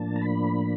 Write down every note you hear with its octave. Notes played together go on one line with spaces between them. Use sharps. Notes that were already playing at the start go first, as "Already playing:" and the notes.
Already playing: A2 F3 A#3 D4 A5
A#5
B5